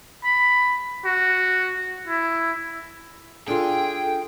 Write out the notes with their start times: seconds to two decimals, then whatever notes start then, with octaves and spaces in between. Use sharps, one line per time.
0.24 B5
1.05 F#4
2.08 E4
3.48 D4 F4 G#4 A4 G5